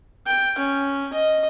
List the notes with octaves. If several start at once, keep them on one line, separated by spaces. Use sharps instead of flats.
G5
C#4
D#5